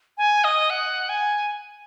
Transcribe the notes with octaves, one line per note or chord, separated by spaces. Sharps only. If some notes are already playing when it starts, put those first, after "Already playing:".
G#5
D#5
F#5
G#5